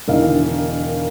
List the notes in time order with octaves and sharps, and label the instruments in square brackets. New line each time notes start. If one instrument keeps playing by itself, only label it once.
[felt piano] E1 D3 D#3 E4 D#5 F5